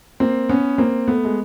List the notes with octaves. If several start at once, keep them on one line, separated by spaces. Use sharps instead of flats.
A#3 C4
B3 C#4
A#3 C4
A3 B3
G#3